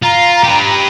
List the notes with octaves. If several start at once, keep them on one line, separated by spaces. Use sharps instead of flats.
F4 A#5
G4 B4